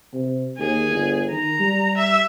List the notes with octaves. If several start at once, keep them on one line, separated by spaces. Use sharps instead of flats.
C3
D#2 G#4
G1
D#3 A#5
G3
E5